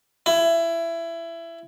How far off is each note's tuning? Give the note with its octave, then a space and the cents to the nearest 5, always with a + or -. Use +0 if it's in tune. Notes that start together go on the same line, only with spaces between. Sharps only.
E4 +20